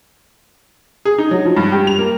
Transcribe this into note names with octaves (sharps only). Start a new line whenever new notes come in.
G#4
D#4
F#3
F3
G2
G4
F7
A#3